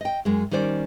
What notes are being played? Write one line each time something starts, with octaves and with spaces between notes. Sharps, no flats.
D#5 G5
F#2 G#3
D#3 G3 C#4 C5 D5